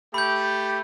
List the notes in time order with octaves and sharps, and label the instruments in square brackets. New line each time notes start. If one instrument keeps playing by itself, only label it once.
[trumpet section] A3 G4 [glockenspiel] B5 G6